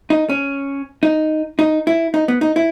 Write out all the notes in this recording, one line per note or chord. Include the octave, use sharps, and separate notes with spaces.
D#4
C#4
D#4
D#4
E4
D#4
B3
D#4
E4